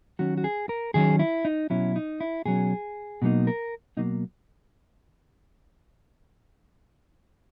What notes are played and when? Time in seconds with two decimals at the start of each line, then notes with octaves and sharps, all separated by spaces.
0.19 D#3 F#3 C#4 F#4
0.38 F#4
0.44 G#4
0.69 A#4
0.94 D#3 F#3 C#4 G#4
1.19 E4
1.45 D#4
1.70 B2 F#3 C#4 E4
1.96 D#4
2.21 E4
2.45 B2 F#3 C#4 G#4
3.22 B2 F#3 A#3 D#4
3.47 A#4
3.97 B2 F#3 A#3 D#4